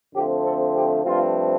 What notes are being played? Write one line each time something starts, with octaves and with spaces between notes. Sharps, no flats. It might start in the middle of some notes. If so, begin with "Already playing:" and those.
F2 D3 F3 A3 C4 G4
A4
G4
G2 F3 A3 C4 F4